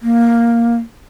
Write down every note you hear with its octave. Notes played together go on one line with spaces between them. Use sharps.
A#3